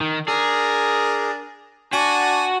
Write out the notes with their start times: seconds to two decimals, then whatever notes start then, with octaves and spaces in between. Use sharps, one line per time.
0.01 D#3
0.28 D4 G#4 A#4
1.93 D4 F#4 G#5 A5